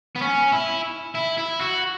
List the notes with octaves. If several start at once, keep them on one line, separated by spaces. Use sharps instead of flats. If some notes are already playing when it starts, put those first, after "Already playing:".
B3
C#4
E4
E4
E4
F#4